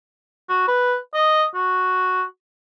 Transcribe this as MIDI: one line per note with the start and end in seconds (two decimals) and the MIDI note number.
0.49 0.65 66
0.68 0.96 71
1.14 1.45 75
1.55 2.23 66